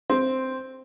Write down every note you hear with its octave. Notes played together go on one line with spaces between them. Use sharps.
C4